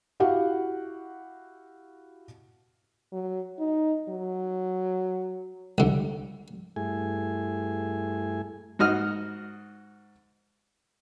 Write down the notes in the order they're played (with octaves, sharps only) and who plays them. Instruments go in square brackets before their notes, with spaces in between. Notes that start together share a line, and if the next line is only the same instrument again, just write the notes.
[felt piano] E4 F#4 G4 F5 F#5
[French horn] F#3
D#4
F#3
[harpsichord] C2 D3
[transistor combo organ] G2 A3 E4 G#4 G#5
[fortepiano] G#2 F#4 D#5 F6